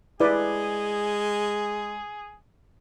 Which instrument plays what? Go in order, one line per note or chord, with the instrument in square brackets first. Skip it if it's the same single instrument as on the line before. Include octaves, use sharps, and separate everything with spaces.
[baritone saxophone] G#3 [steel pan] E4 B4 D5 [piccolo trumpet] G#4